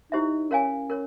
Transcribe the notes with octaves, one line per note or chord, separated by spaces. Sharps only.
D#4 E4 G4 C5 E5
C#4 A#4 C#5 F5 G#5
A#4 C#5